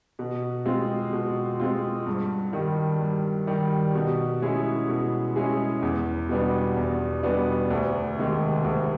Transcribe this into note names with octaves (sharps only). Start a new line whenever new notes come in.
B2
G#3 C4 F4
B2
G#3 C4 F4
G2
D#3 G3
G2
D#3 G3
B2
G#3 C#4 E4 G#4
B2
G#3 C#4 E4 G#4
E2
B2 G3 B3 D4
E2
B2 G3 B3 D4
D2
C3 D#3 G#3
D2